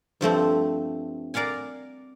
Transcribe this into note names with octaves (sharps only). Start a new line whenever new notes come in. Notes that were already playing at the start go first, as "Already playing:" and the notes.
G2 F3 A3 C4
A#4 D5 F5 F#5 G#5